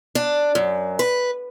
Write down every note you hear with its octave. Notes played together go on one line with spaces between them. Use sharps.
D4
F#2
B4